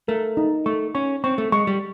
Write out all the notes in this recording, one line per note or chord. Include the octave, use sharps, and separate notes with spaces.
A3 A#4
D#4
A3 C#6
C#4 C#6
C4 C#6
A3
G#3 C#6
G3